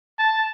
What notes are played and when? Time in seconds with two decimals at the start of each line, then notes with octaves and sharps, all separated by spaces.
0.19 A5